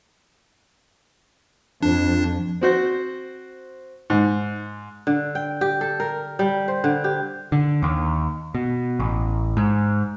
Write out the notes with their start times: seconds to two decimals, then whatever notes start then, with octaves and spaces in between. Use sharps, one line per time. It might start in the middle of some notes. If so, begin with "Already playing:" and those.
1.83 F2 D4
2.61 C4 F#4 C5
4.10 G#2
5.07 D3
5.35 G5
5.61 G4
5.81 A4
6.00 A#4
6.39 G3
6.68 C5
6.84 D3
7.04 G4
7.52 D3
7.83 D#2
8.55 B2
9.00 A1
9.57 G#2